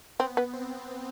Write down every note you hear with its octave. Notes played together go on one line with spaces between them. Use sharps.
B3 C4
B3
C4